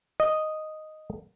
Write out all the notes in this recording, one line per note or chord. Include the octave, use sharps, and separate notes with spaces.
D#5